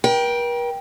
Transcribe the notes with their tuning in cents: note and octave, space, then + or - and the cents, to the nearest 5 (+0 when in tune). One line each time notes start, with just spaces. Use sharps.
A#4 +45 G5 +0